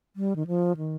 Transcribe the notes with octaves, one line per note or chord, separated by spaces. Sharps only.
G3
D#3
F3
D#3